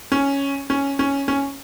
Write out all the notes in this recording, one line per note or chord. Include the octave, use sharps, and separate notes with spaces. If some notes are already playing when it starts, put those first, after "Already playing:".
C#4
C#4
C#4
C#4